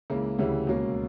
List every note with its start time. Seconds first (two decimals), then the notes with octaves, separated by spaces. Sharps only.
0.10 C#2 C#3 E3 A#3
0.39 D2 C#3 E3 G3
0.67 C#2 B2 A#3 C#4